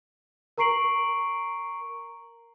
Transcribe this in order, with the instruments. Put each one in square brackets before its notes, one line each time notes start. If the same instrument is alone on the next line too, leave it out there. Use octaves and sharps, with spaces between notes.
[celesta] A#4 A#5 C#6 C7 D7 F#7